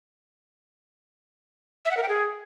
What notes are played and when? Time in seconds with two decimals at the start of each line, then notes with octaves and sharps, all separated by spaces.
1.85 E5
1.91 F#5
1.97 A#4
2.03 G5
2.08 G#4